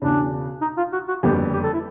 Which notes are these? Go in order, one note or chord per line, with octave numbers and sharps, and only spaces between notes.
E1 E2 C#3 D4
D#4
F4
F#4
F#4
F#1 F2 D3 G3 B3 G4
G4
A4
E4